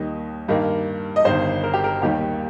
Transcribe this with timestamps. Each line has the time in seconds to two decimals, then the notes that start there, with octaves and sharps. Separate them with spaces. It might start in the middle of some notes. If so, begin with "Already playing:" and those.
Already playing: D#2 D#3 G3 D#5
0.48 G2 D#3 A#3
1.16 D#5
1.24 G1 G2 D#3 C5
1.64 A#4
1.74 G4
1.84 A#4
2.02 D#2 D#3 G3 G4